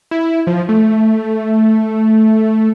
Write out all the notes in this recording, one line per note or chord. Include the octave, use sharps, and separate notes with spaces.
E4
F3
A3